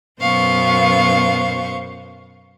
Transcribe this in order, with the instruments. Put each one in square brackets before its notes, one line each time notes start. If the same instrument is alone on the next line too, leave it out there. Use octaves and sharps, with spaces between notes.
[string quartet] F#2 B2 B3 C5 F5 C#6